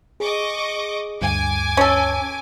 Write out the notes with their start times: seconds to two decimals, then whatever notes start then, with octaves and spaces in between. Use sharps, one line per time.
0.20 G#4 D#5 C#6 D6
1.22 D2 G2 G#5 D6
1.77 C#4 A4